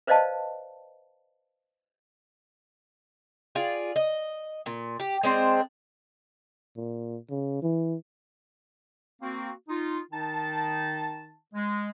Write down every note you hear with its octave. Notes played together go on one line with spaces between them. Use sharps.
B4 C5 D5 D#5 F5 A5
F4 G#4 D5
D#5
A#2
G4
G#3 C4 D4 C5
A#2
C#3
E3
A#3 C4 F#4
D#4 F4
D#3 D#4 A5
G#3